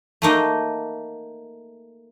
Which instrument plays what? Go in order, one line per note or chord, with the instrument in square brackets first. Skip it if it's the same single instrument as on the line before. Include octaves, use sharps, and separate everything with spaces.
[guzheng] A3 A#3 D#4